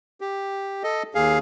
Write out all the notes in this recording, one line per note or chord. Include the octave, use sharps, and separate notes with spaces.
G4
A4 D#5
D#2 G#4 F5